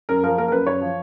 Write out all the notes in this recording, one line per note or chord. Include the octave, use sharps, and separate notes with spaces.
F#2 A#4
F3 A#4
A#3 A#4
A#4
F#2 B4
F#2 C#5
F3